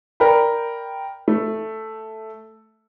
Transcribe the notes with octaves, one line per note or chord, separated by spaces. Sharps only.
A#4 D5 G5 B5
A3